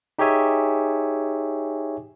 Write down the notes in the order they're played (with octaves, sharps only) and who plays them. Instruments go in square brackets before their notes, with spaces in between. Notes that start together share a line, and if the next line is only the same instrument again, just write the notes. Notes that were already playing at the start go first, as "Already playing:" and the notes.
[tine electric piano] D#4 G4 G#4 C#5 E5 G#5